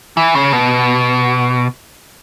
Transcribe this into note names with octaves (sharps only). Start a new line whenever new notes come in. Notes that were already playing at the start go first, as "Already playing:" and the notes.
E3
C#3
B2